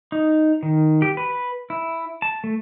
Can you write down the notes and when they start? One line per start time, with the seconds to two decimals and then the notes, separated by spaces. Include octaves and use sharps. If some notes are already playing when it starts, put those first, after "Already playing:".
0.12 D#4
0.63 D#3
1.02 G4
1.17 B4
1.70 E4
2.22 A5
2.44 A3